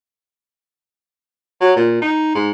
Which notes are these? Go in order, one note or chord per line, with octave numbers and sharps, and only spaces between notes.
F#3
A#2
D#4
G#2